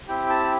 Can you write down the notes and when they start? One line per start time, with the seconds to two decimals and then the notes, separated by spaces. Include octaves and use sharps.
0.08 C4 E4 G4 G5
0.29 A5